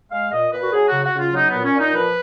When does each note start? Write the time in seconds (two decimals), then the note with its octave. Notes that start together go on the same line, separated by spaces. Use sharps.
0.11 G#3 F5
0.31 A#2 D#5
0.52 A#2 B4
0.63 F#4
0.72 F#3 G#4
0.87 F#4
0.92 C#3
1.03 F#4
1.13 C#3 F4
1.33 F#3 D#4
1.49 B3
1.54 A#2
1.64 C#4
1.74 A#2
1.79 D#4
1.94 F3 B4